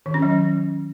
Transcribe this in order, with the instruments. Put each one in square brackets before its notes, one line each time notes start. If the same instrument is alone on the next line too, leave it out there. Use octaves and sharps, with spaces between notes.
[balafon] D#3
C#4
F#3